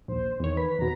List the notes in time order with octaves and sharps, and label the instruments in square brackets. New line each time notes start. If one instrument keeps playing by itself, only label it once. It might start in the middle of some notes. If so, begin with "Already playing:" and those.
[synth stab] A#1 D#2 [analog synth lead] C5
[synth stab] E2 C#5 [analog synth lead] D#3
[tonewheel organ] B4 B5
[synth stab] E2 B2 [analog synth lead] A#5